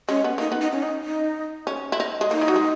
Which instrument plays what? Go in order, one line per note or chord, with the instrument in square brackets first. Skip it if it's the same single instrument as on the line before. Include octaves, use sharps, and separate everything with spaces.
[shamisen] G#3 [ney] C#4
[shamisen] B3
[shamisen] A#3 [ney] D#4
[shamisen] B3
[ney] D#4
C#4
D#4
D#4
[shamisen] C#4
E4
D#4
G#3
[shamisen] A#3 [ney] D#4
[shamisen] E3
F#3
G#3